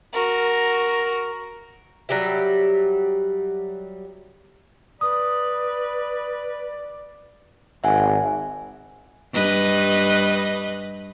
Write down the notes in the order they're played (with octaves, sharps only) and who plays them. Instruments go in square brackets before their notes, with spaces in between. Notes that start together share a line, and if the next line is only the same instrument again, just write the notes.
[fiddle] F#4 A#4
[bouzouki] F#3 G3 G4 E5
[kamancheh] B4 [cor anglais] D5 [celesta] D#6
[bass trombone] G#1 [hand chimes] E5 F#5 G#5
[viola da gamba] G2 B4 D#5